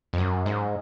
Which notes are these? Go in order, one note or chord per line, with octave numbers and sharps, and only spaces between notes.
F2
F#2
G#2